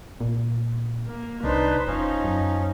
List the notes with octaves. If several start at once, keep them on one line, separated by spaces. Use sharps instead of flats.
A#2
A#3
C2 D4 D#4 B4 C5
F1 F3 C#4 D#4
F#2